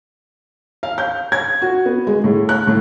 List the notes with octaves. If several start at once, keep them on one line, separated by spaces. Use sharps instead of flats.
F5
G6
G#6
F#4
B3
G#3
A2
F#6
A2